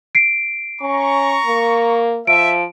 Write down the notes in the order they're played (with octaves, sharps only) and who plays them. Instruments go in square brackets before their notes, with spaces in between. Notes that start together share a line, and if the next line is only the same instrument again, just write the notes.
[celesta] C7 D7
[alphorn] C#4 [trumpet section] A#5 C#6
[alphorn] A#3
[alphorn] F3 [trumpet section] E5 [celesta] D7